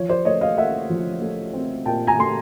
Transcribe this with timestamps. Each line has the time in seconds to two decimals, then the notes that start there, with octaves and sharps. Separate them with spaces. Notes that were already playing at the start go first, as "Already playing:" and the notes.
Already playing: F3 C#5
0.09 C5 D5
0.25 A3 C#5 D#5
0.41 D#5 F5
0.58 A3 E5 F#5
0.90 F3
1.22 A3
1.53 C4
1.86 A#2 G5 A5
2.07 G#5 A#5
2.19 A3 C6